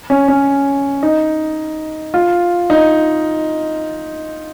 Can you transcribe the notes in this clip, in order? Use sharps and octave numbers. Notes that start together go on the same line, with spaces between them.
C#4
C#4
D#4
F4
D#4